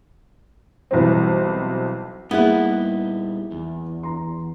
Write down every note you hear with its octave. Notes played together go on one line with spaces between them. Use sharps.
B1 E3 G3 C4
G3 A#3 B3 D#4 E4 G4 G#4 F#5
E2
A#5 C6